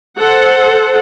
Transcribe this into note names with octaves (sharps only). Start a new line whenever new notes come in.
A4 C5 F#5